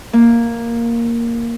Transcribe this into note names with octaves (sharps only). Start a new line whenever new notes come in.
A#3